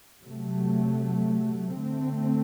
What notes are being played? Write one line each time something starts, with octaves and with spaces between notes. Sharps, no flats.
C3 F#3 A3
D3 A3 C4